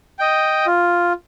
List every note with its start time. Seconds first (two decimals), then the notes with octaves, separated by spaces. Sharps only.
0.19 D#5 G5
0.66 F4